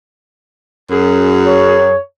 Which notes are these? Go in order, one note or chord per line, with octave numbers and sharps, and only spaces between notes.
F#2 G#4
C#5